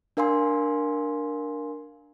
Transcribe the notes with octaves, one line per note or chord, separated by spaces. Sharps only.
D4 A#4 F5 G#5 C6